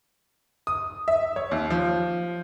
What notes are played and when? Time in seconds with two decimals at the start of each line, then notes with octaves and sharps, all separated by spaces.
0.67 D#6
1.08 E5
1.36 C#5
1.51 D#2
1.70 F3